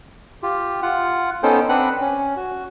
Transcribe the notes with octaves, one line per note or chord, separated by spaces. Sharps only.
F4 G4
F4 F#5
B3 C#4 D#4 A4 C5 G5
C4 D4 B4 F#5 B5
C#4
F#4